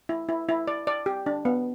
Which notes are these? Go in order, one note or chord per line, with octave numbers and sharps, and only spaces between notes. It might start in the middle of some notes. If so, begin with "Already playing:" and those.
E4
E4
E4
D5
D5
G4
D4
B3